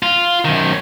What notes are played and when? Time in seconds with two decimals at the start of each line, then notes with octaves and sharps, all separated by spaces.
0.03 F4
0.45 F#2 D#3